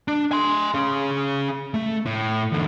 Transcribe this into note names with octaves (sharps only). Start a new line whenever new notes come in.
D4
G#5 C6
C#4 G#4
A3
A2
E2 D3